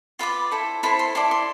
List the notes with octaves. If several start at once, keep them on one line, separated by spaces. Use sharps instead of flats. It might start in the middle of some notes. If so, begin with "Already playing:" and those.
F4 B4 D5 B5
E4 A4 C5
E4 A4 C5 B5
C6
E4 A4 D5 C6
C6